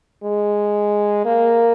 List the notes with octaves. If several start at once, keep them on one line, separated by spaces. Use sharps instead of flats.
G#3
A#3